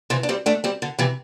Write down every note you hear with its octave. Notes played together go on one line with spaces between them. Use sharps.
C3 E3
D4
G3 C4
A3 D4
G3 C4
D3
C3 E3